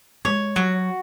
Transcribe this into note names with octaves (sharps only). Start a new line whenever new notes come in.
G#3 C#5
F#3 F#4